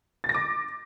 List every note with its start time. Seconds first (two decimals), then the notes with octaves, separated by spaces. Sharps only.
0.24 A6
0.29 A#6
0.34 D6